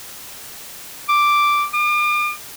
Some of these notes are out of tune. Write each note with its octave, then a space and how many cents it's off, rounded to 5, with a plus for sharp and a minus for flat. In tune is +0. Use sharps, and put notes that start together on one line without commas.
D6 +0
D6 +40